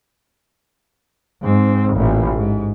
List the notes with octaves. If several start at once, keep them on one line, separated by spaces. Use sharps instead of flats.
G#2 C4
A1 A#2
G#2